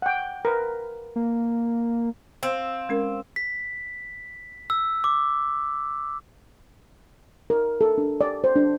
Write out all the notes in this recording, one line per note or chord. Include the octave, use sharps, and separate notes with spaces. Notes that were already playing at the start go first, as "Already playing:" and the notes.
F#5 G5
A#4 B4
A#3
C4 F5
G#3 C#4 A#4
B6
E6
D6
A#4
A4
D4
D5
C5
D4